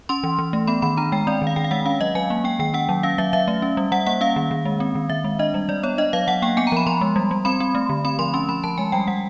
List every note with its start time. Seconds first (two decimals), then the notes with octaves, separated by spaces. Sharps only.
0.09 C#4 C6
0.24 E3
0.39 E3
0.53 A3
0.67 B3 B5
0.82 D#3 B5
0.97 D4 A#5
1.12 G#3 G5
1.27 C4 D5
1.42 D#3
1.47 F5
1.56 D#3 G5
1.64 F5
1.71 G#3 F#5
1.86 C#4 F5
2.00 F#3 D#5
2.15 F#3 G#5
2.30 A#3
2.44 A#3 G5
2.59 D#3 G5
2.74 C#4 F#5
2.89 F#3
3.03 C#4 F5
3.18 F#3 E5
3.33 F#3 E5
3.48 A3
3.62 C#4
3.77 G3
3.92 G3 F#5
4.07 A#3 F#5
4.21 C#4 F5
4.36 D#3
4.51 D#3
4.65 G#3
4.80 C4
4.95 D#3
5.10 D#3 E5
5.24 G#3
5.39 D4 D#5
5.54 G3
5.69 G3 D5
5.83 B3 C#5
5.98 D4 D#5
6.13 F#3 F5
6.28 F#3 F#5
6.42 A#3 G5
6.57 B3 G#5
6.67 A#5
6.72 F3 B5
6.86 F3 C6
7.01 G#3
7.16 G3
7.31 G3
7.45 C4 B5
7.60 C4
7.75 A3
7.89 D3
8.05 C4 B5
8.19 F3 C6
8.34 C#4 C6
8.49 F3 B5
8.64 F3 A5
8.78 G#3 G#5
8.92 G3 G5
9.07 G3 F#5